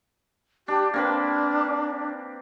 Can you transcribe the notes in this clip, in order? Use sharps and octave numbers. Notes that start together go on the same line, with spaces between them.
D4 G4
A#3 C4 D4 B4